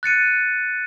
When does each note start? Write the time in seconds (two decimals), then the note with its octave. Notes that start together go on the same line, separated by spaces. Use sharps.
0.03 F#6 A6 C#7 D#7